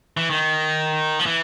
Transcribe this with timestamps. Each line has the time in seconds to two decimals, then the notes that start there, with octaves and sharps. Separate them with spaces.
0.17 E3
0.30 D#3
1.19 F3
1.26 E3